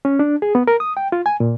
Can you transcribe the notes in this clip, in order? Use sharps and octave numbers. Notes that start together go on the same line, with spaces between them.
C#4
D4
G#4
B3
A#4
D#6
G5
F4
G#5
A#2